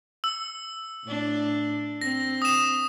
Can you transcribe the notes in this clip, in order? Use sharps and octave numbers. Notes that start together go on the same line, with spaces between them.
E6
A2 D4
C4 A#6
D#6 E7